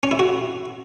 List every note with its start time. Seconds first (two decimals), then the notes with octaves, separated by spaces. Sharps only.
0.03 C#4
0.11 E4
0.19 F#4